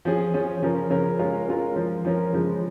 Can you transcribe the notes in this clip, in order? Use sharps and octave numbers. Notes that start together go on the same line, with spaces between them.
F3 C#4 G#4
F3 C#4 G#4
C#3 F3 C#4 A#4
C#3 F3 C#4 A#4
G#3 C#4 F4 A#4
G#3 C#4 F4 A#4
F3 C#4 A#4
F3 C#4 A#4
C#3 F3 G#3